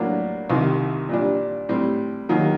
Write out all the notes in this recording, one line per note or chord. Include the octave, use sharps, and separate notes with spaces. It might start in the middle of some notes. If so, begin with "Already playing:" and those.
Already playing: A2 F#3 A#3 D4
C2 C3 D#3
A#2 G3 D4
A2 G3 C4
D#2 D#3 F#3 A#3